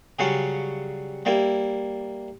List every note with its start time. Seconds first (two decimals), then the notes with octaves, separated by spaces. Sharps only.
0.19 C#3 F#3 G3 C#4 F5
1.25 G3 A#3 E4